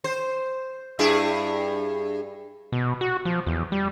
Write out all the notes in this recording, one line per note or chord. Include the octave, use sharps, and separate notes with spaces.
C5
G2 E4 G#4
B2
F#4
F3
E2
G3